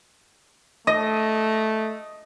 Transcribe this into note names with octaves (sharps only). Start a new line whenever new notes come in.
A3 D#5